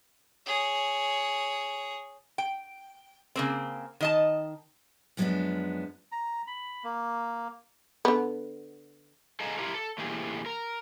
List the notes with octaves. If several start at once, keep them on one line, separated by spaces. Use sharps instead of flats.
G#4 C#5
G5
C#3 A#3 C4
D#3 D#5 A5
F#2 F3 G#3 A#3 B3 D4
A#5
B5
A#3
D3 B3
G#4 A4 D#5 F5 A5 A#5
E4 F4 G4 A#4
A4
A2 E3 A#3 G4 G#4
A#4